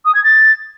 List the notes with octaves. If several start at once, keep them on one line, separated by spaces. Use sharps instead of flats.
D#6
G#6
A6